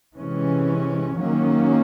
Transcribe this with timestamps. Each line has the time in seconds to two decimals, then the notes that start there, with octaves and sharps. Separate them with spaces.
0.16 C3 E3 G#3 C#4
1.16 D#3 F#3 A#3 C#4